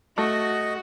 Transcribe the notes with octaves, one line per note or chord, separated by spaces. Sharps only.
A3 F#4 D#5